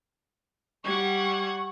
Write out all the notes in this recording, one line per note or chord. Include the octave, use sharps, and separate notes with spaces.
G3 F#5 C#6 G#6